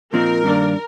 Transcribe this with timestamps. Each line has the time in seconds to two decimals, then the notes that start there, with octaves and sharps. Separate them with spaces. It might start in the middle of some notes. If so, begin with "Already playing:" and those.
0.13 A#2 F3 C4 D#4 A#4
0.44 G2 D#3 A#3 D4